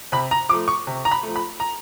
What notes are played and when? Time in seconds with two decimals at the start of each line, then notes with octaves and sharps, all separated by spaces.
0.12 C3 B5
0.31 A#5
0.49 F3 D6
0.53 A3
0.68 C#6
0.87 C3
1.05 A#5
1.11 B5
1.23 F3 A3
1.36 B5
1.60 A#5